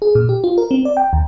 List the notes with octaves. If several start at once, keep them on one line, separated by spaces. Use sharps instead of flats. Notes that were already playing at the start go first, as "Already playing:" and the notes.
G#4
A#2
G4
F4
A#4
C4
D5
G5
D#2